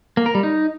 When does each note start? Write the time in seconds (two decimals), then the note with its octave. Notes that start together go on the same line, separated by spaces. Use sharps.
0.17 A#3
0.26 A#4
0.35 G3
0.43 D#4